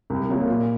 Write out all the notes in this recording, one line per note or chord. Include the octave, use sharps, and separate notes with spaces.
C2
C3 F#3 A#3 F4
A#2